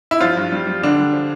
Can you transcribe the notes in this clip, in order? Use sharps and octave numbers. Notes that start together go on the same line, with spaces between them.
E4
G2 F3 F4
G2
G3
G3
D3 G3 D4
G3
F3